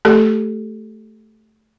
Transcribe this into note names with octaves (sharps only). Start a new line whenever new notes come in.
A3 G4 A4